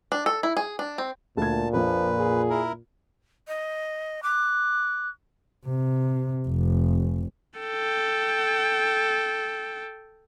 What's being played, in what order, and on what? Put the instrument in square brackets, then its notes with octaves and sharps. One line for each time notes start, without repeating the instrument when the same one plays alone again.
[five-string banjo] D4
A4
E4
G#4
D4
C4
[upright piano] D2 G#6 [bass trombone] A#2 [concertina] A5
[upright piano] A#1 F2 [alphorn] F3 [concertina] B4
[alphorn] G#4
[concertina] E4 A#4
[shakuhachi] D#5
[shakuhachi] D6 [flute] F#6
[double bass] C3
F1
[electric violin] A4 G5